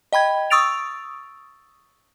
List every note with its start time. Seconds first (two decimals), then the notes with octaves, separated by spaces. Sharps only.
0.13 D#5 G5 B5 G#6
0.50 C#6 D#6 E6 A6 D7 F7